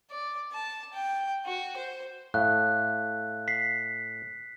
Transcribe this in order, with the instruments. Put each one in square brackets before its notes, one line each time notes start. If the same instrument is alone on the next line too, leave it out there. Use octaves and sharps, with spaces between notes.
[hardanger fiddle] D5
A5
G5
F#4
C5
[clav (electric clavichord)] A2 [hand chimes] F5 [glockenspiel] F#6
[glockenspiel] B6 C7